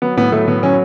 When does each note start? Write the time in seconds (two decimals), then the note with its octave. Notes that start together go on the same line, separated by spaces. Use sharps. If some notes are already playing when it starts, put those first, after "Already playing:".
0.02 F#3 B3
0.17 A2 B3
0.32 F#3 A3
0.47 A2 B3
0.63 F#3 C#4